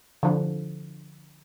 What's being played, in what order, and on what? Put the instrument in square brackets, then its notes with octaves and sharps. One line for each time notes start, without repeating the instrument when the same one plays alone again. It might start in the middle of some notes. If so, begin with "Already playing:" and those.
[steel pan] D3 F3